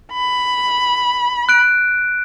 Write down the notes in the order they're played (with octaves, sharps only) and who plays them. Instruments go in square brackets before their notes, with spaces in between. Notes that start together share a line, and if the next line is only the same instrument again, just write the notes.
[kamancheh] B5
[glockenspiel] F#6 D7